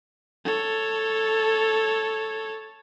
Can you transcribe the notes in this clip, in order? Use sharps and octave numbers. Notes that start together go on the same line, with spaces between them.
A4 C#5